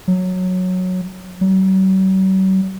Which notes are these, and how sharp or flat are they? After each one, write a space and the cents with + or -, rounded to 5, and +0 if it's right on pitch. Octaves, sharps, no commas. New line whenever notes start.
F#3 -10
F#3 +45